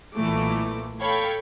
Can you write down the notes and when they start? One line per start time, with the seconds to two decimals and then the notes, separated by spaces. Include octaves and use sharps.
0.15 B1 A#2 E3 A3 D6
1.01 A4 C#5 F5 G5 B5 G#6